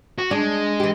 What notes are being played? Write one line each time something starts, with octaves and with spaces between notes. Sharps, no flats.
F#4
G#3 D4
E3 G4